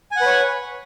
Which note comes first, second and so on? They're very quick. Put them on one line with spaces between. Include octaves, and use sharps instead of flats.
G#5 F#5 B4 C#5